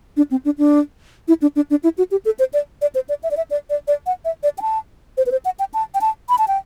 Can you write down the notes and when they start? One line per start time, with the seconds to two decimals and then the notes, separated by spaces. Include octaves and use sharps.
0.17 D4
0.31 C4
0.45 D4
0.58 D4
1.28 E4
1.42 D4
1.56 D4
1.70 D4
1.84 E4
1.98 F#4
2.11 G4
2.25 A4
2.39 C5
2.53 D5
2.82 D5
2.95 C5
3.09 D5
3.23 E5
3.31 D5
3.37 E5
3.51 D5
3.70 D5
3.88 D5
4.06 F#5
4.25 E5
4.43 D5
4.58 G5
4.62 A5
5.17 C5
5.26 B4
5.32 C5
5.45 F#5
5.59 G5
5.74 A5
5.94 G5
6.01 A5
6.29 B5
6.38 A5
6.48 G5